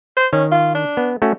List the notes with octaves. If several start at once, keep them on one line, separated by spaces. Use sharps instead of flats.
C5
D#3 C#4
F4
D4
B3
A3 C#4 F#4